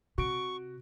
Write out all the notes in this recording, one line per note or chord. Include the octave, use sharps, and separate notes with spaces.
C3 F#4 C#6 D7